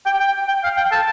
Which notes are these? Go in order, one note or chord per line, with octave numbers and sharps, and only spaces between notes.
G5
G5
G5
F5
G5
A5